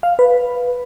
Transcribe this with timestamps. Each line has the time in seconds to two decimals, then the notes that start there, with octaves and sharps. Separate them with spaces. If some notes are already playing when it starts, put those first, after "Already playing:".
0.03 F5
0.19 B4